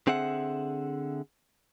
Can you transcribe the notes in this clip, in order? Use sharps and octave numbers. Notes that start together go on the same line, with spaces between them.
D3 C4 G#4 E5 F#5